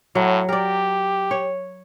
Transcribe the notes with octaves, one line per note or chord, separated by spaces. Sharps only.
A2 F#3
G4 A#4 D5
C#5